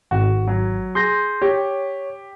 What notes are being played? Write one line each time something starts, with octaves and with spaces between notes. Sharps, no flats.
G#1 F#4
F#3
G#4 C6 G6 A#6
G4 C#5